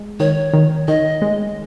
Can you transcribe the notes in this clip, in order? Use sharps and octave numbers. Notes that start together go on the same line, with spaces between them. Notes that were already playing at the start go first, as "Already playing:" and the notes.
Already playing: G#3
D#3 C#5
D#3
D#3 D#5
G#3